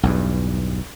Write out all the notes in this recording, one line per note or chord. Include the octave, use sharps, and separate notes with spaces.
B1 E2 G2